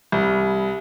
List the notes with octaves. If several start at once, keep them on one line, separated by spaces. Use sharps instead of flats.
C2